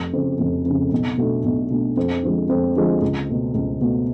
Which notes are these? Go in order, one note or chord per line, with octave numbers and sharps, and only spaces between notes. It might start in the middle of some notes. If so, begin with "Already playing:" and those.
Already playing: F1
F2 C#3
F1
F2
C#3
B1
B2 A3 D4
B1
B2 A3 D4
F2
D3 F3 G#3
F2
D3 F3 G#3
C#2
B2 A3
C#2
B2 A3